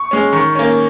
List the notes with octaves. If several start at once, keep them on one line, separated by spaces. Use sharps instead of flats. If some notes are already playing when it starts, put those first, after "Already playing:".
Already playing: C#6
G#3 C#4
D#3 C#6
A#3 C#4